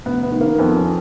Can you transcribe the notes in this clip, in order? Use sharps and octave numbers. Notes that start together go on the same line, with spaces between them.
F1 B3
B3
D#3
A#3
F2 B3
C#4